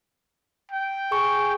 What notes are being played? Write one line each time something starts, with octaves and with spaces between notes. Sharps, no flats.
G5
G#4 C#6